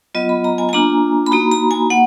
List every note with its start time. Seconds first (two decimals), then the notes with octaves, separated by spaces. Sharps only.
0.15 F#3 B3 F4 D#5
0.29 B5
0.44 A#5
0.58 G#5
0.69 G#5
0.73 A#3 D4 F4 A#5
1.27 B5
1.32 A#3 D#4 F#4 A#5
1.52 A#5
1.71 G#5
1.90 A#3 F#5